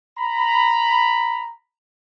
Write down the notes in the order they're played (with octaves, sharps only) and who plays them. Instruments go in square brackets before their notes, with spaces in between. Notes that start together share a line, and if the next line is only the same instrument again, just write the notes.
[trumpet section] A#5 B5